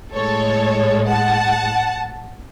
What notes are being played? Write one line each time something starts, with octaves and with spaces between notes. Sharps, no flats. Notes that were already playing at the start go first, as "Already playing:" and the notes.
A2 G#3 A4 C#5
F#5 A5